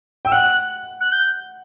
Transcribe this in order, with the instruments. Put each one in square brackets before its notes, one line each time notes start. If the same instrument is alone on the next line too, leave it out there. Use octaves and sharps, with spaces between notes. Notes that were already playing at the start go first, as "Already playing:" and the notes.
[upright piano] G5 [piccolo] E6
[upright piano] F#5 [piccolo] F#6
[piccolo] F#6
G6